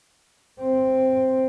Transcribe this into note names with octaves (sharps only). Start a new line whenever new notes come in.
C4